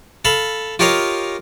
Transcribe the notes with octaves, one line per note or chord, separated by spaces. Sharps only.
A4 F5 B5
F4 G4 A#4 C#5 D#5 F5